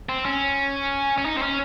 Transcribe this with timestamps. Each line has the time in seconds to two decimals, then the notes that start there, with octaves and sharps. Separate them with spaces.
0.09 C4
0.25 C#4
1.18 C#4
1.25 D#4
1.37 C4
1.42 C#4